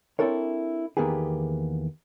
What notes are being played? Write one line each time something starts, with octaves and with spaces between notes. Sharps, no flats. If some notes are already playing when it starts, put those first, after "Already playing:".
C4 D4 E4 A4 A#4 C#5
E2 D#3 A#3 B3 G4 G#4